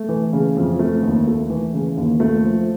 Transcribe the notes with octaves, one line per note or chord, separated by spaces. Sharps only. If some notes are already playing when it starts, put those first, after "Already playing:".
Already playing: A3
E3
C#3
F2
A3
D#2
A3
E3
C#3
D#2
A3
F3